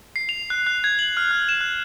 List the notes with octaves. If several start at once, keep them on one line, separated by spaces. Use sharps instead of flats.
C7
F7
F#6
F#6
G#6
F#7
F6
F#6
E7
F#6